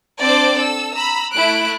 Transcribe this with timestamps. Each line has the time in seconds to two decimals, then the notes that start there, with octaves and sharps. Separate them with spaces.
0.21 C4 D4 C5 D5 D6
0.58 A4 E6
0.95 A#5 B5 E6
1.33 A3 E4 F#6 D7